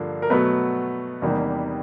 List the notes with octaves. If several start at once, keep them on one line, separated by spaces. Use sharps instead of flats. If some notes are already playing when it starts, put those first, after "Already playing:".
Already playing: G2 D3 F3 A#3
A#4
B2 F#3 A3 B3 B4
E2 C3 D#3 G3 A#3